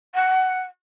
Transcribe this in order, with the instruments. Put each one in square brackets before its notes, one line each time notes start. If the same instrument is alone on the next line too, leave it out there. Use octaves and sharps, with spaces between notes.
[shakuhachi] F#5